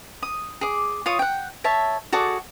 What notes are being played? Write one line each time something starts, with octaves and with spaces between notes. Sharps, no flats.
D#6
G#4 D6
F4 C#5 D#6
F#5 G5
C#5 E5 A5
F#4 G#4 A4 D5